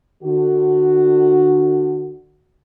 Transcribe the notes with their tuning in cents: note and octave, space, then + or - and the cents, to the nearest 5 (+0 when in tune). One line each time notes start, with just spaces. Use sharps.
D3 +30 F#4 +0